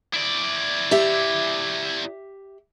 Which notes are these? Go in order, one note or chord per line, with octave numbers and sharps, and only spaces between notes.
E4 D5
G4 E5